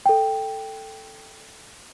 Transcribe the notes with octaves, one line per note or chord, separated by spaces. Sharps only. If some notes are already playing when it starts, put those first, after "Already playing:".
A4 G5